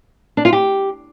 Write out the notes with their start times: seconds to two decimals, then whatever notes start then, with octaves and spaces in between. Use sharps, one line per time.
0.37 D4
0.45 F4
0.53 G4